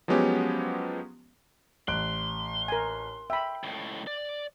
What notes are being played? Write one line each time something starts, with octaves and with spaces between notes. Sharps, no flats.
F3 F#3 G#3 B3 C#4 G4
A1 C6 F#6 D7
A#4 G#5
E5 G5 B5
C#2 A2
D5